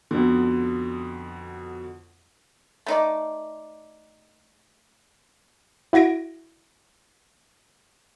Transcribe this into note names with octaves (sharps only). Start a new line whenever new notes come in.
F2 B2 D3
A3 D#4 D5
E4 F#4 G#6 A#6 D7